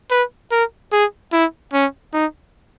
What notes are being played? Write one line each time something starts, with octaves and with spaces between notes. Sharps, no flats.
B4
A#4
G#4
E4
C#4
D#4